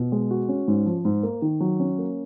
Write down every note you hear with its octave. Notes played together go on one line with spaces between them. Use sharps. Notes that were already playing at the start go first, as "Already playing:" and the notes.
Already playing: B2
G#3
F#4
C#4
G#2
F3
G#2
A#3
D#3
F#3
C#4
A#3